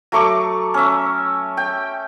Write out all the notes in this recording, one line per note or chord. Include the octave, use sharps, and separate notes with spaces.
F#3 A3 C#6 D6
C#4 E5
G5